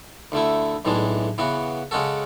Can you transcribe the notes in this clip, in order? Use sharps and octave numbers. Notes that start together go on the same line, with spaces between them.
D2 D3 A3 E4
B1 A2 E3 G#3 D4
C#3 E3 B3 F#4
C#3 G#3 C#4 F#4 A4